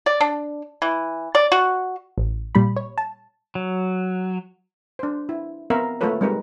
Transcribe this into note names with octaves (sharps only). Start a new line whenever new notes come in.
D5
D4
E3
D5
F#4
A1
A#2 G3 B5
C#5
A5
F#3
D4 C5
E4
B3 C4 A#4 E5 F5
A3 A#3 F4 A4 B4 C#5
G3 G#3 C4 D#4 A#4 B4